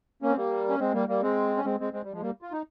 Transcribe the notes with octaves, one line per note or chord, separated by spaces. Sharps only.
A#3 C#4
C4
G3 A#3
C#4
G#3 C4
G3 A#3
G3 A#3
G#3 C4
C#4
G#3 C4
G#3 C4
G#3 C4
G3
F3 G#3
G3 A#3
F4
D#4